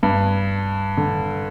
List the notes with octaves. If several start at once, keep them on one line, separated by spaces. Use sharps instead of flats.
G2
D3